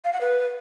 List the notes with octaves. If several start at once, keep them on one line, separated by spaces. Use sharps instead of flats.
F5
F#5
B4